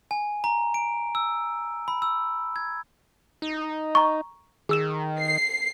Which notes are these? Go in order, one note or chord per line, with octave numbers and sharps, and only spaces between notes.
G#5
A#5
D7
E6
B5
E6
G#6
D#4
A#5 C#6
D#3 G#4 E6 E7
C7